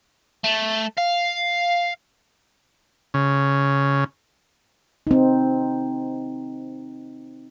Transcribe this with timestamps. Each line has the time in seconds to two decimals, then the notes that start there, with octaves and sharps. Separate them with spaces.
0.44 A3
0.97 F5
3.14 C#3
5.07 C4 D#4